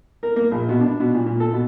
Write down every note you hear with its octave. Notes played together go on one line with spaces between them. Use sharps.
A#4
A#3
A#1
B2
D4
B2
A#2
A#2
A4
B2